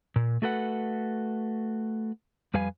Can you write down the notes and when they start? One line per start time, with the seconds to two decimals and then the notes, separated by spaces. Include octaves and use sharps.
0.16 A#2
0.42 A3 F#4 A4 B4 F#5
2.54 F2 G3 B4 F5 G#5